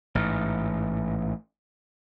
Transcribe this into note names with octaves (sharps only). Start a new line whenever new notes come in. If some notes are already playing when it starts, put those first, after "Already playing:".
A1 G#2